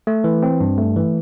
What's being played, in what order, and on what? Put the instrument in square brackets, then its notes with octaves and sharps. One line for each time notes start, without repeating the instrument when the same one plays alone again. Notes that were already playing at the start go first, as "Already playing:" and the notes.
[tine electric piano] A3
E3
C4
G2
A3
E3